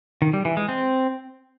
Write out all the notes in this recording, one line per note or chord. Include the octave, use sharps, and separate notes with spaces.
D#3
G3
E3
G#3
C4